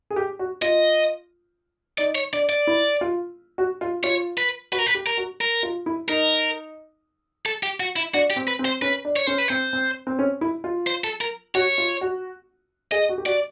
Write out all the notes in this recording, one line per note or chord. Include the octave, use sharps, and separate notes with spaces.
G#4
G4
F#4
F4 D#5
D#4 D5
C#5
D4 D5
D5
E4
F4
F#4
F4
F4 C#5
B4
F#4 B4
A#4
B4
G4
A#4
F#4
A#4
F4
E4
D#4 A#4
A4
G4
F#4
E4
D4 F#4
G4
C4
B4
C4
C5
C#4 B4
D4
C#5
C#4 C5
B4
C4 C5
C4
C4
C#4
E4
F4
C5
A4
A#4
F#4 C#5
F4
F#4
G#4 D#5
F#4
G4
F#4 D5